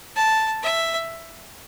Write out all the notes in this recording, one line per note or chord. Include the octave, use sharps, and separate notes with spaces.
A5
E5